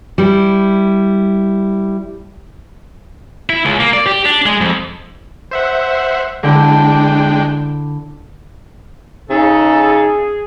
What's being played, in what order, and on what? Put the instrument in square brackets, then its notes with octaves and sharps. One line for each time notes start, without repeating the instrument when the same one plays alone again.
[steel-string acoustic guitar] G3 E4
[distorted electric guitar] E4
C#2
A#3
D5
G4
D4
G#3
F2
[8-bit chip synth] C5 E5 F#5
[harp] D3 E4 [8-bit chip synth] G#3 D4 G5
[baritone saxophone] C#3 [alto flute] D#4 [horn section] G#4 [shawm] A4